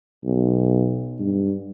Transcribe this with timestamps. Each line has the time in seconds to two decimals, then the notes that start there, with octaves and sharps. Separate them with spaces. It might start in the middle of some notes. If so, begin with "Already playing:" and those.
0.24 B1
1.20 G2